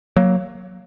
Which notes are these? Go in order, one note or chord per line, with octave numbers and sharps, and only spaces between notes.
F#3 A#3